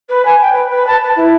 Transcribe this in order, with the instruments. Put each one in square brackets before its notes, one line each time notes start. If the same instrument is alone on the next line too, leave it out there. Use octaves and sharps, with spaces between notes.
[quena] B4
G#5
G5
B4
B4
A5
B4
E4